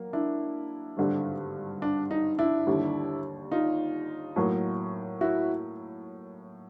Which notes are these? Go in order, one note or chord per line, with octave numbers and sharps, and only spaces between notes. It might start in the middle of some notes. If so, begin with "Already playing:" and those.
Already playing: F#3 A#3
D4 E4
G#1 G2 D3
D4
D#4
D4 E4
D#2 D3 G3
D#4 F4
A2 F#3 A#3
E4 F#4